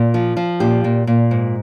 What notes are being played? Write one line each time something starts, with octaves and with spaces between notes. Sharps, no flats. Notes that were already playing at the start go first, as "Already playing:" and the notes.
Already playing: A#2
F3
F3
A#2 G4
A#2
A#2
G#2